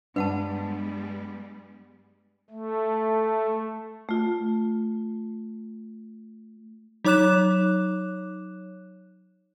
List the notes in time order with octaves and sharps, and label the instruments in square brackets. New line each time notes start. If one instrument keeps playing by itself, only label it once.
[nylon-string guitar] G2 [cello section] G3 G#3 B3 [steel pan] D4 [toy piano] B4 F#5 A5
[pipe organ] A3
[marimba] A3 F4
[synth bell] F#3 D#4 C#5 D6 F#6 E7